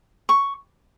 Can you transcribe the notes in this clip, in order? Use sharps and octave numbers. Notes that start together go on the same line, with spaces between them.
C#6